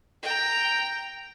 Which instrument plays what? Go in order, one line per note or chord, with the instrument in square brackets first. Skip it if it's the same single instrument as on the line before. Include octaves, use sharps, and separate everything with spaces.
[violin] G5 A#5